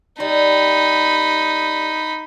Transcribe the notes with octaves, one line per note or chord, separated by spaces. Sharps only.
G3 D#4 B5